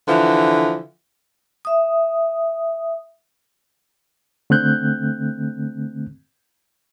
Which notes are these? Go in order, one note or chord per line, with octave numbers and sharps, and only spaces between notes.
D3 E3 F3
E5 D#6
D3 A3 C4 F#6 G6